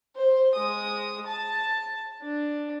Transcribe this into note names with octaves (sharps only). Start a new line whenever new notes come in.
C5
G#3 D#6
A5
D4